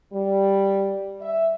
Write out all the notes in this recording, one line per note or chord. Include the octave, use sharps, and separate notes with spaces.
G3
E5